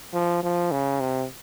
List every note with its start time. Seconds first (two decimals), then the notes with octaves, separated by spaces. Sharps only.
0.14 F3
0.43 F3
0.72 C#3
1.00 C3